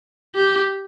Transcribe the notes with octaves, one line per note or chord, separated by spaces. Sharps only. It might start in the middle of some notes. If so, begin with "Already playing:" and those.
G4